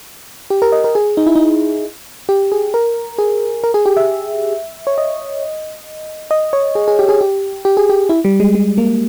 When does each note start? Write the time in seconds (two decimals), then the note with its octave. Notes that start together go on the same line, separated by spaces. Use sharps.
0.50 G4
0.62 A#4
0.72 D#5
0.84 A#4
0.95 G#4
1.17 D#4
1.27 E4
1.35 D#4
2.29 G4
2.52 G#4
2.74 A#4
3.18 G#4
3.64 A#4
3.74 G#4
3.86 G4
3.97 E5
4.87 C#5
4.98 D#5
6.31 D#5
6.53 C#5
6.75 G#4
6.88 G#4
6.99 G4
7.09 G#4
7.21 G4
7.65 G4
7.77 G#4
7.89 G4
8.09 E4
8.25 G3
8.40 G#3
8.55 G#3
8.78 A#3